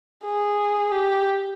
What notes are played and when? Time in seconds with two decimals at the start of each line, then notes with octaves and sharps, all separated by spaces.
0.24 G#4
0.91 G4